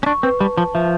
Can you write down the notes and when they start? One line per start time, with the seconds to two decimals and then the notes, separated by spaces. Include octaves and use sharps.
0.03 C#4
0.06 D4 C#6
0.23 C4 B4
0.40 G3 A5
0.57 F3 A5
0.74 F3 E5